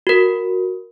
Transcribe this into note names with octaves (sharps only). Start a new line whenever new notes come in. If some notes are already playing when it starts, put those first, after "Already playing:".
F#4 A#4